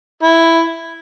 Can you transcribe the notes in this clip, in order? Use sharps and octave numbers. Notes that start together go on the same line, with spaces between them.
E4